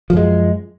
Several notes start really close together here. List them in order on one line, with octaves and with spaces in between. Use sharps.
F3 F#2 G#3